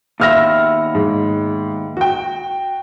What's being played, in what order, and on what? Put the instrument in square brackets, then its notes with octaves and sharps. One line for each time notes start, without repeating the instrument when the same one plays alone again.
[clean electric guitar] D#2 B3 E5 [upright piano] F5 F6 A#6
[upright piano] G#2
F#4 G5